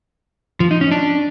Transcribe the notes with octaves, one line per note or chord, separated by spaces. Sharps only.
F3
D#4
C#4
D4